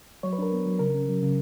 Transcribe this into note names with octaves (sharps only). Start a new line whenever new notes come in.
F#3 C#5
B4
D4 A#4
B3
F#3
C#3 A#4
C#4
F#3
C#3